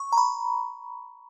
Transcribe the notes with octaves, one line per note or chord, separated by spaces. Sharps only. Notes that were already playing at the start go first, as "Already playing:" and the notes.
Already playing: C#6
A#5
B5